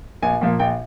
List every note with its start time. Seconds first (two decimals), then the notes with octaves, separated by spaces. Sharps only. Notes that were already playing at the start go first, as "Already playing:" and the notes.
0.23 A#1 G#5
0.41 A#2 F3 A#3
0.59 A#1 G5